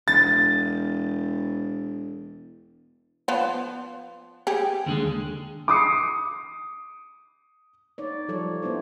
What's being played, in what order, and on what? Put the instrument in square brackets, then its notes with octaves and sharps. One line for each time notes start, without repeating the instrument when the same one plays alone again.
[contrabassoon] E1 [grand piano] A6
[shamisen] F3 B3
G4 G#4
[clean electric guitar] D#2 D3 G#3
[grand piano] D6 D#6 C7 C#7
[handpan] D#4 C#5 D5
F3 G3 A4 C#5 D5
A#3 B3 D4 E4 C5